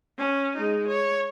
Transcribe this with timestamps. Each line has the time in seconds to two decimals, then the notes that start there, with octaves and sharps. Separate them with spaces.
0.18 C#4
0.56 G#3 D#4
0.88 C#5